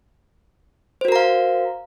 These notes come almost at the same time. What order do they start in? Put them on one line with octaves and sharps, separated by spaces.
C5 F#4 A#4 A#5 F5